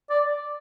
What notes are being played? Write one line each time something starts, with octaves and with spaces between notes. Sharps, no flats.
D5